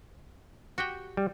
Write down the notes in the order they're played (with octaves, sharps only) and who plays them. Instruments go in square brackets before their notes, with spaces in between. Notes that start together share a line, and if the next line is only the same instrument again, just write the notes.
[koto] F#4 G4 G5
[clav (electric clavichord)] G3